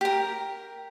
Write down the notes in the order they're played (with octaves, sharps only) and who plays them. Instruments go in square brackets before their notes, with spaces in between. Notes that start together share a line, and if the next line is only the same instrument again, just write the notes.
[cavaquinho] G4 A#4